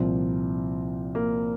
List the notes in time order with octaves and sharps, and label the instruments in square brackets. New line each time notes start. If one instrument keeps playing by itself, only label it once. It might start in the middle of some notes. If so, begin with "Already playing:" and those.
Already playing: [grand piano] C2 A#2 F3 C4
A#3